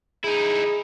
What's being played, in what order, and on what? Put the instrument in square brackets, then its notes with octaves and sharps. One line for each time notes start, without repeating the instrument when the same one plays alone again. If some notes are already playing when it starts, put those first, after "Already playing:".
[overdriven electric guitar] D#4 E4 [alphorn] G#4